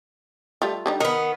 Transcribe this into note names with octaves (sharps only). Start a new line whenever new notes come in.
G3 A3 F4
D3 G3 D#4
D#3 B3 A#4